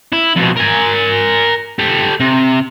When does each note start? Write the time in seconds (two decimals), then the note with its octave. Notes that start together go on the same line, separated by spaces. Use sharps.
0.13 E4
0.36 F2 B2
0.57 A#4 G#5
1.79 G4 A4
2.20 C3